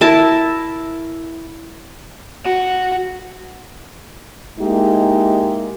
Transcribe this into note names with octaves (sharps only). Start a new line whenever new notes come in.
E4 A#4 A5
F#4
G#3 A#3 D#4 E4 G4